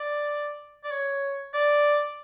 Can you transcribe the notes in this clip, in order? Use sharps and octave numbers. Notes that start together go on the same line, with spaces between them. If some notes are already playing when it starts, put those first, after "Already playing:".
Already playing: D5
D5
C#5
D5